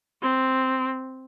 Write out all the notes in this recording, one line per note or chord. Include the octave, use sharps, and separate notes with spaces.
C4